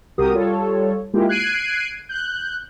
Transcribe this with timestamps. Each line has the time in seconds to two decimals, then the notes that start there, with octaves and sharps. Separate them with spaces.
0.18 C2 F#4 G4 A#4 D#6
0.33 G3 F4 A4 C#5
1.14 G#3 A#3 E4 F4 G4
1.29 F#6 G#6 C7 D7 D#7
2.09 F#6 G6